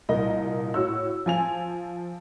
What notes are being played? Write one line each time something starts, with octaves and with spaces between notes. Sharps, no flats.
C2 A#2 A#4 D#5
A2 F#4 C#5 E6
F3 G#5 F7